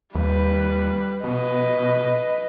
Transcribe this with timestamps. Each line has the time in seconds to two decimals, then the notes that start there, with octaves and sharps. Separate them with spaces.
0.15 D#2 G3 B4
1.24 B2 B4 D#5